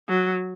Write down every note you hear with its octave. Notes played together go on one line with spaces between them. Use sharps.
F#3